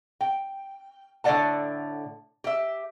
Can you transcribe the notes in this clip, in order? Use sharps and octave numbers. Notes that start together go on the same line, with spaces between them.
G5
A2 D3 A4 D5 F#5 A5
G4 E5